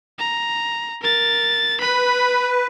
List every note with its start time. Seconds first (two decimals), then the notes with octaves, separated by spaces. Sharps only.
0.19 A#5
1.02 A#4 A6
1.81 B4 B5